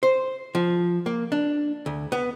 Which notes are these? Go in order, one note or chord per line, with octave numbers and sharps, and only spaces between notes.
C5
F3
A#3
D4
D2
B3